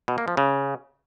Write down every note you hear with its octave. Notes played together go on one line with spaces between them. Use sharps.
B2
A#3
F3
C#3